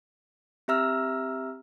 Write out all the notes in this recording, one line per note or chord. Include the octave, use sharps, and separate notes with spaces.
C4 G4 E5 A#5 E6 F6